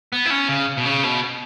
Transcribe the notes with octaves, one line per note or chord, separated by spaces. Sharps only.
B3
E4
C#4
C#3
B2
C#3
B2